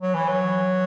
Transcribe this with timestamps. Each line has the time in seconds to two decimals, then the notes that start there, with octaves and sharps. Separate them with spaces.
0.01 F#3
0.14 E3
0.28 F#3